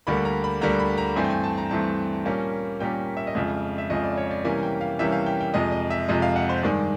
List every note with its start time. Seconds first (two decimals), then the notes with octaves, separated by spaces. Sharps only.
0.07 D2 D3 G3 A#3 B5
0.25 A#5
0.44 B5
0.61 D2 D3 G3 A#3 A#5
0.79 B5
0.98 A#5
1.16 G2 E3 A3 C4 G#5
1.24 G5
1.30 G#5
1.44 A5
1.58 A#5
1.71 G2 E3 A3 C4 A5
2.25 A#2 G3 A#3 C#4
2.80 A#2 G3 A#3 C#4 G5
3.17 E5
3.27 D#5
3.35 F2 C#3 F3 G#3 E5
3.78 E5
3.90 F2 C#3 F3 G#3 D#5
4.03 D5
4.17 C#5
4.31 D5
4.44 C3 E3 G3 A#3 C#4 G#5
4.63 G5
4.81 F5
4.99 C3 E3 G3 A#3 C#4 E5
5.12 F5
5.26 G5
5.41 G5
5.54 F2 C3 F3 G#3 D#5
5.72 D#5
5.90 E5
6.08 F2 C3 F3 G#3 D#5
6.22 F5
6.36 F#5
6.49 C5
6.63 G2 D#3 G#3 D5